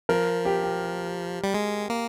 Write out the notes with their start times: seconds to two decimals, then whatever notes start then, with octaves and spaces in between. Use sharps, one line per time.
0.09 F3 A#4
0.45 G4
0.63 G4
1.44 G3
1.54 G#3
1.90 A#3